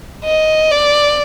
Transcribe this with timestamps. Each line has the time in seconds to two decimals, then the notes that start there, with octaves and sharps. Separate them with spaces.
0.25 D#5
0.71 D5